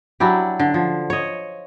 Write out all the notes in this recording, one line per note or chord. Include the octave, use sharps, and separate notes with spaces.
F#3 D4 E4 G4
D3
F3
C#5 D#5